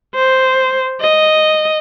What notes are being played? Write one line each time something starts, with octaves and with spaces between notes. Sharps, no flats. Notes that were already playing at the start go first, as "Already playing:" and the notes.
C5
D#5